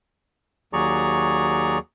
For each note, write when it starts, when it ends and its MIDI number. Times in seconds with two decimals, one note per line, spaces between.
0.73 1.78 39
0.73 1.78 54
0.73 1.78 68
0.73 1.78 74
0.73 1.78 82
0.73 1.78 85